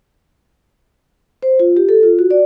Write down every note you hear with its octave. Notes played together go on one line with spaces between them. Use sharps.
C5
F4
G4
A4
F4
F#4
D5